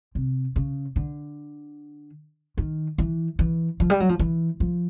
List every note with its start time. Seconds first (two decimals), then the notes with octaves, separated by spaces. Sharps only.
0.15 C3
0.56 C#3
0.96 D3
2.57 D#3
2.98 E3
3.39 E3
3.80 F3
3.90 G3
4.00 F#3
4.09 F3
4.19 E3
4.60 F3